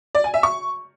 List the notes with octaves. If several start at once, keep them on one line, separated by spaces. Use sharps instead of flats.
D5
G#5
E5
C#6